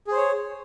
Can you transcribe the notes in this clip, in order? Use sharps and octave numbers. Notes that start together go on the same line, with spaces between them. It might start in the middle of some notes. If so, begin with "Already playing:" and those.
G#4 C5 C#5